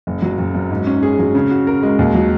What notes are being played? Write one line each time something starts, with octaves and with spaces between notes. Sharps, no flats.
F#1
F#3
F#1
F#2
G#2
C#4
G#4
F#3
C#3
F#4
A#4
G#3
D#2
F#3